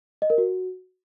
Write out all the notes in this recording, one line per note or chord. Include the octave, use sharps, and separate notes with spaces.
D#5
A#4
F#4